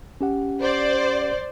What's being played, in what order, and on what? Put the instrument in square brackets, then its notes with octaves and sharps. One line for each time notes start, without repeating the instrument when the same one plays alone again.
[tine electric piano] C#4 G4 F#5
[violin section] C5 D5